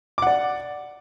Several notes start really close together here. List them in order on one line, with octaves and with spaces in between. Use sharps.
D6 F#5 D5